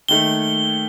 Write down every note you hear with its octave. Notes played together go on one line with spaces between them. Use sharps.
D#2 D#3 A3 G7